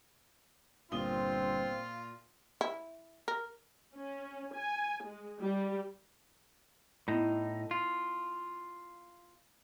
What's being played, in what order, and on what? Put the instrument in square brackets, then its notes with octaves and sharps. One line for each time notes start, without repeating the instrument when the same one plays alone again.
[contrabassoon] G1 [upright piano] A#2 D#6 G7 [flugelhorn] C4 [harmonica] F4
[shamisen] E4
A#4
[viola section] C#4
G#5
G#3
G3
[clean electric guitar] A2 D#4 [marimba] B3 E4
[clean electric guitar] F4